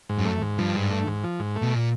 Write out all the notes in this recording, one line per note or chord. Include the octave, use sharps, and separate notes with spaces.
G#2
F#2
A3
G#2
G2 F3
G#2
A3
G#2
F3
G#2
A3
B2
A#2